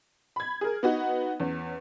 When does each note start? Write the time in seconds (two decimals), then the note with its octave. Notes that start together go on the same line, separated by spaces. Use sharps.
0.36 B5 G#6
0.61 G#4 A#4
0.83 B3 D#4 F#4 F#5
1.40 E2 C#4